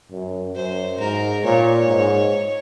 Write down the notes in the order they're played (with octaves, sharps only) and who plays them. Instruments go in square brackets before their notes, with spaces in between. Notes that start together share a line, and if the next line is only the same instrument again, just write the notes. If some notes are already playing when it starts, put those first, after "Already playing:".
[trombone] F#2
[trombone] F#2 [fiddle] C5
[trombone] G#2 [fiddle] A#4
[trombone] A#2 [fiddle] C#5
[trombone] G#2